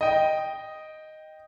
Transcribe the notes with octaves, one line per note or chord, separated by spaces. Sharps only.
D#5 G5